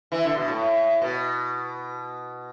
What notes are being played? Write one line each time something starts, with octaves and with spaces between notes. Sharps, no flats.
E3
D3
B2
A2
B2